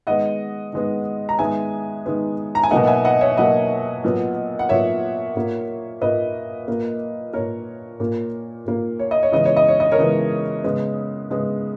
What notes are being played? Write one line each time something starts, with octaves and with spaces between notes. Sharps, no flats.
D#3 G#3 B3 D#5 F#5
D#3 G#3 B3
A#5
D#3 G#3 B3 E5 G#5
D#3 G#3 B3
A#5
G#5
B2 F#3 A#3 D#5 F#5
F#5
E5 G#5
D#5 F#5
C#5 E5
B2 F#3 A#3 D#5 F#5
A#2 F#3 B3
F#5
A#2 F#3 B3 C#5 E5
A#2 A#3
A#2 A#3 B4 D#5
A#2 A#3
A#2 A#3 A#4 C#5
A#2 A#3
A#2 A#3
C#5
D#5
C#5
C#3 E3 G#3 B3 D#5
C#5
D#5
C#5
D#5
A#4 C#5
C#3 E3 G#3 B3
C#3 G#3 B3
C#3 G#3 B3